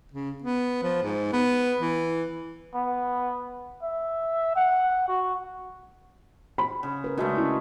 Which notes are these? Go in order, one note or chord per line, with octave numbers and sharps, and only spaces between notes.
C#3
B3
F3
G#2
B3
E3
B3
E5
F#5
F#4
B5
C#3
A#4 B4
C#3 G#3 A3 D4 F#4 D#5
C#4 E4